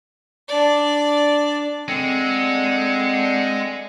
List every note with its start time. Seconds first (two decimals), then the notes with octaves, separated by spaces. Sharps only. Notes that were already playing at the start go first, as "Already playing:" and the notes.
0.48 D4 D5
1.88 D3 G#3 C4 C#7